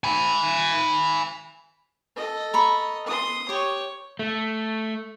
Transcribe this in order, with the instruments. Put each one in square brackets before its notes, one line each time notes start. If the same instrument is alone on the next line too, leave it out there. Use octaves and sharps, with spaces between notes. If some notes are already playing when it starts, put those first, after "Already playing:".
[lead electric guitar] G#5 B5
[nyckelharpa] A4 D#5
[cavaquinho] A#5 B5 C#6
[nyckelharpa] C6 D#6
[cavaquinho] G4 C#6 [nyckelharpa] C#5
[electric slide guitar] A3